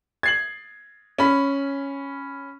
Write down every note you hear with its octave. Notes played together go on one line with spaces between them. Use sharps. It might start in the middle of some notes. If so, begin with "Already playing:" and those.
G#6 C7 F#7
C#4 B5